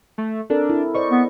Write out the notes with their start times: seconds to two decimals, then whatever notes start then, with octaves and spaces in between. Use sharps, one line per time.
0.18 A3
0.50 C4 D4 A4 A#4
0.70 E4
0.94 C5 D5 D#5 C#6
1.10 B3